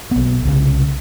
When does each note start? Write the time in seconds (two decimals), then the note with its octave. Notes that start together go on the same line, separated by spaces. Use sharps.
0.11 B1 B3
0.45 C2 C#3